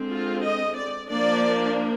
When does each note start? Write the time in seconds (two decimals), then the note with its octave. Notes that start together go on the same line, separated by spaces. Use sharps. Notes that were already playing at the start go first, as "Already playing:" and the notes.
Already playing: D3 G#3 C4
0.11 F4
0.44 D#5
0.77 D5
1.10 F3 A#3 D4 D5